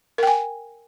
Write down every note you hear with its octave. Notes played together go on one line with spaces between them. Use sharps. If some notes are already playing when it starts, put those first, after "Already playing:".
A#4 G5 G#5